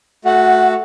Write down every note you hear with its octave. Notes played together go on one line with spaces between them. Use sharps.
A3 F#4 F#5